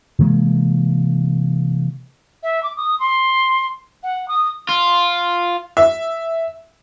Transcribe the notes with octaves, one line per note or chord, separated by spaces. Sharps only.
C3 E3 G#3 A#3
E5
D6
D#6
C6
F#5
D#6
F4
E5